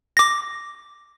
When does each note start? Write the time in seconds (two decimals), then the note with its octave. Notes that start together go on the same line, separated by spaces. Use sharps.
0.17 D6 A#6